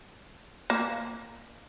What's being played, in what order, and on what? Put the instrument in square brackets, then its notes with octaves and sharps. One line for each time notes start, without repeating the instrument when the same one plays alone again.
[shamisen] A#3